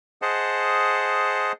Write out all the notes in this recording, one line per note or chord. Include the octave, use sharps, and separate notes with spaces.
G#4 C5 D#5 F#5 A5